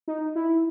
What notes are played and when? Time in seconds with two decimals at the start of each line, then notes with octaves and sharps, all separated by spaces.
0.08 D#4
0.35 E4